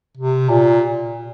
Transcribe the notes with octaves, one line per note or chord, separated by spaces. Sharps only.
C3
A#2